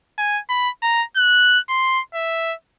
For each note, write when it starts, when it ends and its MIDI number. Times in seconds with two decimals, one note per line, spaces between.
0.18 0.39 80
0.49 0.69 83
0.82 1.03 82
1.16 1.59 90
1.69 2.00 84
2.14 2.53 76